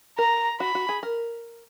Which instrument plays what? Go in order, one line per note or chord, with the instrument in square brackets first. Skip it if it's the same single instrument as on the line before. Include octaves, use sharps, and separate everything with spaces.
[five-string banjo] A#4 [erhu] A#5
[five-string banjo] F#4 [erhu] B5
[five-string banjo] F#4
G#4
A#4